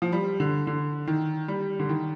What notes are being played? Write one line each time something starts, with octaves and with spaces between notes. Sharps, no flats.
F3
G3
D3
D3
D#3
G3
D3
D#3